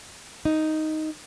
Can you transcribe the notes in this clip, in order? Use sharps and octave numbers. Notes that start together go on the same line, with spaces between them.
D#4